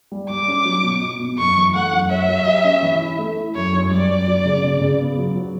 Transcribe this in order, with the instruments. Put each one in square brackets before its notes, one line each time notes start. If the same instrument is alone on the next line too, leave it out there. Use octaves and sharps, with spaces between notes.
[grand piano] G3
[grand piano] G3 [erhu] D6
[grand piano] C#4
F#3
B2
B2
B2
[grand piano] F#2 [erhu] C#6
[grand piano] E3
[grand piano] A3 [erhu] F#5
[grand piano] F#2
[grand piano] C#5 [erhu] E5
[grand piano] F#3
G4
C#4
E3
E4
A3
E4
[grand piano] F#2 [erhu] C#5
[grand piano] F#2
[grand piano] G3 [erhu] D5
[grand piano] F#2
F#3
C#3
C#3
C#3
B3
F#3
F#3